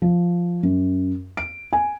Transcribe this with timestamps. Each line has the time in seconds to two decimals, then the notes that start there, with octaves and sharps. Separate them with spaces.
0.02 F3
0.63 F#2
1.37 D7
1.73 G#5